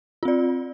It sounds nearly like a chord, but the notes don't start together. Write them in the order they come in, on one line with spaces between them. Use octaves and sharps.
F4 C4 D5